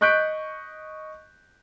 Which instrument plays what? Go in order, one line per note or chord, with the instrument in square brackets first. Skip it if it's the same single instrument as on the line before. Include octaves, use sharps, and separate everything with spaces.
[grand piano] D#5 C#6 F#6 G6 B6 D7